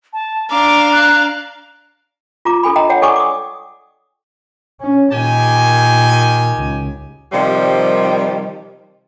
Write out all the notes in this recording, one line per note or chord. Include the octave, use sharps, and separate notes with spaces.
A5
D4 F5 A#5 D6
F#6
F4 A#5 D6
D4 A4 G#5 B5
D#5 G5 A#5
C#5 F#5 G5
A4 D5 G5 G#5 C#6 D6
D6 D#6
C#4
A#2 D#3 G4 G#5
C#2
C3 D#3 F3 G3